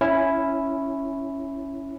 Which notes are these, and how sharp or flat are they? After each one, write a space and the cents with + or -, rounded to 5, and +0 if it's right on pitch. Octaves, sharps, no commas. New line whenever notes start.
C#4 +0 E4 +0